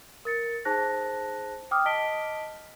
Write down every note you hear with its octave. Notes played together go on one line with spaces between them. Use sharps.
A#4 A6 C#7
D#4 G#4 C5 A5 F#6 A#6
G5 D6 D#6 F6
D#5 A5 B6 D7 G7